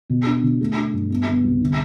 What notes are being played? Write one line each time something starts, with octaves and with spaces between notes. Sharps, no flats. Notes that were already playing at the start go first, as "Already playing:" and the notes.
B2
D4
B2
A3
D4
G2
B3
B3
C2
D3